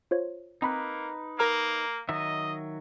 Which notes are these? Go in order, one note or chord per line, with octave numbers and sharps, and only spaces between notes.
F4 C5 C#5
A#3 C4 D#4 B4 B5
A#3 A#4 A#5 F6
D#3 F#3 D#5 E5